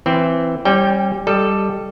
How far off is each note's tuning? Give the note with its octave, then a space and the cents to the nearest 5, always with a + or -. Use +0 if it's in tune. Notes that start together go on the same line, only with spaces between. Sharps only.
E3 +10 C4 +0
G3 -5 C#4 -35 G5 +10
G3 +0 A4 +0 D#5 -15